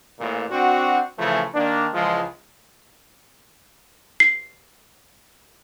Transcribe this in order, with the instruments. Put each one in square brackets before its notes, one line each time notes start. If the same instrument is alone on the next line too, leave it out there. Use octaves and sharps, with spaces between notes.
[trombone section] A1 A#2
C4 D4 F#4
C#3 E3 F3 A3
D#3 A#3 D4
C#2 E3 F3 G#3
[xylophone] C7